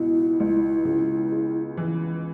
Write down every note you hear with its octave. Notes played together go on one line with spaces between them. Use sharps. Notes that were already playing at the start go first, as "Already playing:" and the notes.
Already playing: C#2 B2 E4
C#2
C#3
G#3
E3